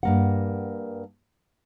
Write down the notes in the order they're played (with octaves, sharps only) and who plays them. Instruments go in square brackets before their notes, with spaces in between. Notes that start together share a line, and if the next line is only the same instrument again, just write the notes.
[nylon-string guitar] G2 A#3 F#5